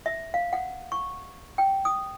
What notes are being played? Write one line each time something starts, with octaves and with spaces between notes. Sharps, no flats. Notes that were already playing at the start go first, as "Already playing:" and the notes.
E5
F5
F#5
C#6
G5
D#6